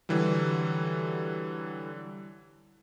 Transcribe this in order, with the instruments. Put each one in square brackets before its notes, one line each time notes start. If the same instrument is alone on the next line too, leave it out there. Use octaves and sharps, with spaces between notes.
[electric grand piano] D3 E3 F#3 G3